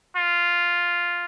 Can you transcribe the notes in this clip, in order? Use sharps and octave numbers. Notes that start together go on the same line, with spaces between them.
F4